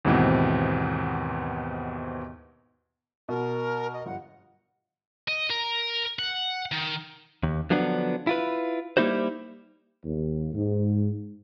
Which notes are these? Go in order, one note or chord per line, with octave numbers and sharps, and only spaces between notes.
D#2 G#2 B2 E3 B3 C4
B2 A#4
D#5
G1 F#5
D#5
A#4
F#5
D#3
D#2
D3 F3 F#3 B3 D4
E4 F4 B4
G3 A#3 D#4 E4 F#4 C5
D#2
G#2